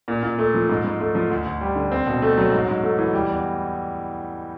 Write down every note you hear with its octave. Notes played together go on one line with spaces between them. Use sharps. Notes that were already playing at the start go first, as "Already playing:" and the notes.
A#2
A#2
A3
F3
G#2
G#2
A3
F3
D2
D2
G3
D3
C4
B2
A3
F#3
G#2
G#2
A3
E3
G3
E2